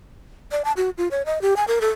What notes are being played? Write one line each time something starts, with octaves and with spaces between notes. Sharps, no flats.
D5
A5
F#4
F4
C#5
D#5
G4
G#5
A#4
A4